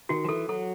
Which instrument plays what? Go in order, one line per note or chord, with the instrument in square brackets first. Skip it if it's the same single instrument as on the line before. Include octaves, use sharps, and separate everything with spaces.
[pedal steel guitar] D#3 [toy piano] F#4
[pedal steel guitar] F3
[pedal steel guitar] E3 [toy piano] A4
[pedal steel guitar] F#3 [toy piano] A4